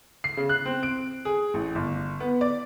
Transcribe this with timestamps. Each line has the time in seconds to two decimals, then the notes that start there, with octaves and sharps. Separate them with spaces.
0.24 C7
0.37 C#3
0.49 F#6
0.66 C4
0.83 D7
1.25 G#4
1.54 A1
1.75 G1
2.20 B3
2.41 D5